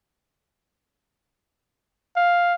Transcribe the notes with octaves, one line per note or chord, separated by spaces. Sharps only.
F5